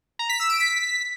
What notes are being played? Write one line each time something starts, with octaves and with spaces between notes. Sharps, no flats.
A#5
B6
E6
D7
B6